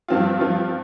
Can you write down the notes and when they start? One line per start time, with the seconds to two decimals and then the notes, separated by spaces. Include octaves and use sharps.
0.08 G2 F3 C4 F4
0.40 G2 F3 C4 F4